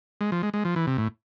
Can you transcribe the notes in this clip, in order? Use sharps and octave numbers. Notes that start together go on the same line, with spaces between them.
G#3
F3
G#3
G#3
F3
E3
C3
A2